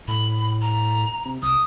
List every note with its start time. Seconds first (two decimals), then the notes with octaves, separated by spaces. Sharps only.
0.08 A2 B5
0.62 A#5
1.25 C3
1.42 C2 D#6